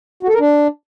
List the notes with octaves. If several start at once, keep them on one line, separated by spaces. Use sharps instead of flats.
F#4
A4
A#4
D4